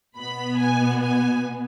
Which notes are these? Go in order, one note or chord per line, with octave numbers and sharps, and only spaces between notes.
B2 B3 B5
G#5
G#5